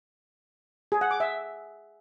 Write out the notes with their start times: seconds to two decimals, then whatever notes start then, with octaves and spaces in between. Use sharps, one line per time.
0.92 G#4
1.01 F#5
1.11 D6
1.20 E5